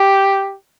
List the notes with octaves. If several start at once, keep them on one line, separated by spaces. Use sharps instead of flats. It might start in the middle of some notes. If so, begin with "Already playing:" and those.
Already playing: G4